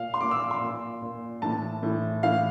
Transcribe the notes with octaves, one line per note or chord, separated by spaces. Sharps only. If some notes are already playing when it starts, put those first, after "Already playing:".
Already playing: A#2 F5
C6
A#2 D6
E6
C6
A#2
A#2
A2 E3 A5
A2 E3
A2 E3 F5